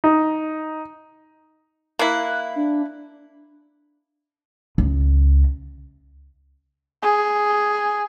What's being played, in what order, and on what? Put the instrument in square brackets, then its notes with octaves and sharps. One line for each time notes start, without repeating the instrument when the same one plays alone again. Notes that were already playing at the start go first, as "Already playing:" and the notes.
[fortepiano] D#4
[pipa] A#3 E4 [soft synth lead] F#6
[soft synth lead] D4
[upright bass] C#2
[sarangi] G#4